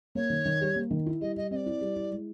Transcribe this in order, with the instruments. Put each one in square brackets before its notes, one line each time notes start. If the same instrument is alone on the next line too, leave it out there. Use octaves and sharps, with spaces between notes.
[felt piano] A#3 [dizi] C#5
[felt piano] D#3
D#3
G3
A#3
D#3
E4
[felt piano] G3 [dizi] D#5
[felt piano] G3 [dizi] D#5
[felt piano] C4 [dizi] D5 D#5
[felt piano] E4
G3
E4
G#3